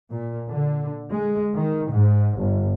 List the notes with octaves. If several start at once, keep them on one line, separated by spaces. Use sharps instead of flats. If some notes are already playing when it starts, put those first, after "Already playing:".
A#2
D3
G#3
D#3
G#2
G1